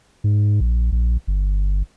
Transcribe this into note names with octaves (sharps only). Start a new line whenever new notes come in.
G#2
A#1
A#1
G1